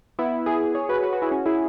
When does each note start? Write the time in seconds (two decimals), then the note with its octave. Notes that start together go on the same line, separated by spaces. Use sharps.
0.19 B3 E4
0.46 E4 G#4
0.75 G#4 C#5
0.89 F#4 B4
1.03 F#4 B4
1.13 F#4 B4
1.22 E4 G#4
1.31 C#4 F#4
1.46 E4 G#4